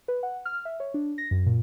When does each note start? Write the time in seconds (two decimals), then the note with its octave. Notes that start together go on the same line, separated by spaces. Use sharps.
0.08 B4
0.23 F#5
0.45 F6
0.65 E5
0.80 C#5
0.94 D4
1.18 A#6
1.31 F#2
1.46 A#2